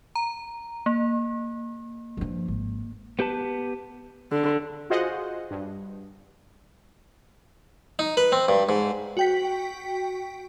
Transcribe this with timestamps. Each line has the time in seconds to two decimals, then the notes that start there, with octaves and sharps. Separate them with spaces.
0.15 A#5
0.86 A#3
2.17 G2 F3
2.48 G#1
3.19 B3 G4 B4 A5
4.31 D3
4.90 F4 F#4 G#4 C5 D#5 F#5
5.51 G2
7.99 D#4
8.17 B4
8.32 C4
8.48 G2
8.69 G#2
9.17 F#4 G5 B6